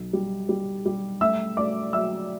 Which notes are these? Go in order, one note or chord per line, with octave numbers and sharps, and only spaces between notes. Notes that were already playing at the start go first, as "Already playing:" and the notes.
Already playing: B1
G3
G3
G3
A3 E5 E6
A3 D5 D6
F#3 E5 E6